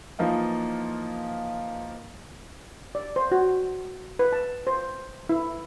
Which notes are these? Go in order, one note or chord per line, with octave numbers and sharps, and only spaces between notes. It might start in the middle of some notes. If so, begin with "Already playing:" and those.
E3 F3 A#3 D#4 F4
D5
C5
F#4
B4
A5
C5
E4